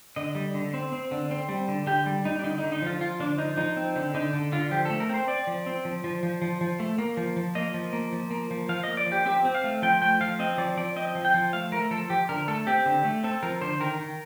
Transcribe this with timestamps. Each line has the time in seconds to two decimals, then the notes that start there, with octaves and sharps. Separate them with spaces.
0.16 D3 D#5
0.35 G3
0.54 D3
0.74 C4
0.93 C4
1.11 D3
1.31 C4
1.49 G3
1.68 D3
1.87 D3 G4
2.06 G3
2.25 G3 D#4
2.39 D4
2.44 D3 D#4
2.58 D#4
2.63 D3
2.72 D#4
2.82 F3 F4
3.01 F3 F4
3.20 D3 D4
3.38 F3 D#4
3.57 F3 D#4
3.77 C4
3.96 D3
4.14 D3 D#4
4.33 D3
4.52 D3 F4
4.71 F3 G4
4.85 A3 A4
5.00 A#4
5.09 C4 C5
5.28 C4 D5
5.47 F3
5.66 C4
5.85 F3
6.04 F3
6.23 F3
6.42 F3
6.61 F3
6.80 A3
6.98 A#3
7.17 F3
7.37 F3
7.55 A#3 D#5
7.74 F3
7.93 A#3
8.12 F3
8.31 A#3
8.51 F3
8.69 F3 F5
8.83 A#3 D#5
8.97 D5
9.07 F3
9.12 G4
9.26 C4 G4
9.45 C4
9.55 F5
9.64 A3
9.82 F3 G5
10.02 A3 G5
10.20 F3 F5
10.39 C4 D#5
10.58 F3 D5
10.77 F3 D5
10.96 C4 D#5
11.15 F3
11.25 G5
11.34 F3
11.53 A3 F5
11.72 A3 A#4
11.91 F3 A4
12.10 F3 G4
12.29 D3 A#4
12.48 A3 A4
12.67 C4 G4
12.86 D3
13.04 A3
13.23 C4 A4
13.43 F3 A#4
13.61 D3 C5
13.80 D#3 A#4
13.99 D#3